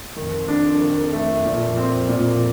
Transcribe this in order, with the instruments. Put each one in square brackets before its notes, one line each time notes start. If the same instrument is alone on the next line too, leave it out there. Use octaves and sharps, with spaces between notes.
[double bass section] F2 [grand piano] D#3
[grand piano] D4
D#3
A3
[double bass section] F2 [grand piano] A#2
[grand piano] C4
A#2